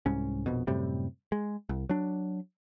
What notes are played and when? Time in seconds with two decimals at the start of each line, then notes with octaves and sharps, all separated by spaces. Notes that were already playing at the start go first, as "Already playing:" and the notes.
0.06 C2 G#2 C#4
0.46 A#1 F2 B2
0.67 F#2 A2 C3 G3
1.32 G#3
1.69 C2
1.89 F#3 D4